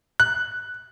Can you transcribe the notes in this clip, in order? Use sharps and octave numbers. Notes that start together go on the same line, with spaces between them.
F#6